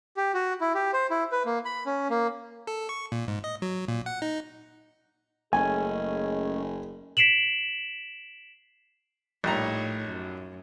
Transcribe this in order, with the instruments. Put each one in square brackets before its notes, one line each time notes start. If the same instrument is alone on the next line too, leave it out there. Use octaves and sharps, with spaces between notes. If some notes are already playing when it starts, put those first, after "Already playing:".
[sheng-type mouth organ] G4
F#4
E4
G4
C5
E4
B4
A#3
B5
C#4
A#3
[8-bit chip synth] A4
C#6
A#2
G#2
D#5
F#3
A#2
F#5
D#4
[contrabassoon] F#1 [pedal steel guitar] A3 C#4 [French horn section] G#4 D#5 [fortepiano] G#5
[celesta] B6 C7 D7 E7 F#7
[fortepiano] A#1 G3 A#5 [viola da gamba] A2 D#4 C#5
[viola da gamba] F#2